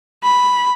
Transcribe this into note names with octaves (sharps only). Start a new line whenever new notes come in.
B5